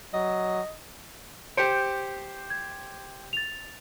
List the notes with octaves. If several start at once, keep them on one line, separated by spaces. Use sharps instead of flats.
F#3 D#5
G4 C5 G6 C#7 D7
G#6
A6 F7